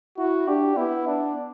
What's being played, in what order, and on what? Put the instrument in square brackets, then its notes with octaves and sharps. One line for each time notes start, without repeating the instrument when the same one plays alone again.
[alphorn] E4 [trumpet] F#4
[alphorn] D4 [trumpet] G4
[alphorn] B3 [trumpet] E4
[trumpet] D4